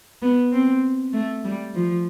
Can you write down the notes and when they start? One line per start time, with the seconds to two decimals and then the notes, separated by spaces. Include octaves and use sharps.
0.22 B3
0.52 C4
1.13 A3
1.45 G3
1.75 F3